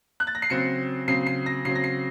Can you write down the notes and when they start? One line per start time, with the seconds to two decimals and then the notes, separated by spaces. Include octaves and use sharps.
0.20 F#6
0.27 A6
0.35 A#6
0.42 C7
0.50 C#3 F#3 C4 C#7
1.07 C#3 F#3 C4 C7
1.27 C7
1.46 A#6
1.65 C#3 F#3 C4 C7
1.75 A#6
1.84 C7